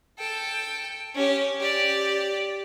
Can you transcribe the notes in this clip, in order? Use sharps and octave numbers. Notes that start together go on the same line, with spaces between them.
A4 G5
C#4 G4
G4 D5